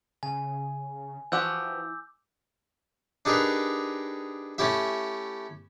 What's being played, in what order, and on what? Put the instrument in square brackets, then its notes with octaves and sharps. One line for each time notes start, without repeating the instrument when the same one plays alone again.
[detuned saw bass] C#3 [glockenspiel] G#5
[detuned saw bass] E3 [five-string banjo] F3 F#4 G4 [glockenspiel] D6 E6 G6
[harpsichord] D4 D#4 G4 G#4 A#4 B4
A3 C#4 E4 G4 E5